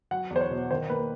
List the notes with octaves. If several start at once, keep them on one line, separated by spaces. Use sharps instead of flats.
F#3 F#5
E2
C5
C#5
B2
D#3 C5
A#3 B4